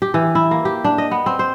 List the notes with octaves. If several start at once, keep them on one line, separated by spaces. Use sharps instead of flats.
G4
E3
E4
A#3
G4
D4
D#5
B3
C4
C5